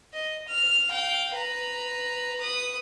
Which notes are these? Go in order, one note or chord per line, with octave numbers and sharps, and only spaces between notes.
D#5
F6
F5 G5
B4 A#5
B4 D#6